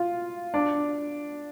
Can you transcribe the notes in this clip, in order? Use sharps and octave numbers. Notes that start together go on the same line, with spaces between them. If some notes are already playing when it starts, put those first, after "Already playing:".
Already playing: F4
D4